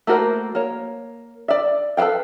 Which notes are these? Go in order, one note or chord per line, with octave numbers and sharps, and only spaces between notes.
A3 A#3 F#4 A#4 C5
A#3 C#5
D5 E5
A4 B4 C5 F5 G5